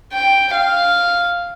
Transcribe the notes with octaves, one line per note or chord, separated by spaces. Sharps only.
G5
F5